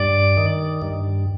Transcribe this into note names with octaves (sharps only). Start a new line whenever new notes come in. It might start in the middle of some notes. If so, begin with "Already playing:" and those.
Already playing: G2 D5
D#3
G2